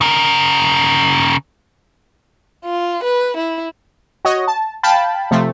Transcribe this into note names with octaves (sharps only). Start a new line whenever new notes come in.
C#3 A#4
F4
B4
E4
F#4 C#5 D#5
A5
F5 G5 A5 B5
C3 F3 A3 C4